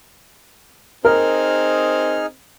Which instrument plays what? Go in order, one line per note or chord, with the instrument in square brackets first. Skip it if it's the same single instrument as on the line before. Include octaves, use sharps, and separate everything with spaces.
[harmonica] C4 [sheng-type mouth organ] D#4 G#4 F6 [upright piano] A#4